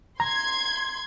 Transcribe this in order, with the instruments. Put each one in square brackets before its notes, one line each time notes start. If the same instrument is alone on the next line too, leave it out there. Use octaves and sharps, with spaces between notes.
[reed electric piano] A#5 [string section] C6 G#6